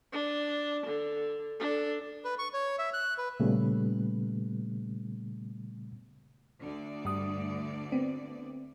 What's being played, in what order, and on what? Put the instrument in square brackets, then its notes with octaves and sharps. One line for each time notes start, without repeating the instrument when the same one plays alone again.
[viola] D4
D3
D4 A4
[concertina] B4
C#6
C#5
E5
F#6
B4
[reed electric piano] A#2 C#3 G3 A3 B3
[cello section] D2 D3 D5
[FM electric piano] G2 G3 D#6
B3 C4